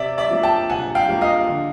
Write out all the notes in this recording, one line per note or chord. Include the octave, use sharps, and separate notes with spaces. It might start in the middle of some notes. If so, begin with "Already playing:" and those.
Already playing: C3 D5 E5
D5 E5
F3 A#3
G5 A5
C3 F#5 G#5
F5 G5
F3 A#3
D#5 F5
D3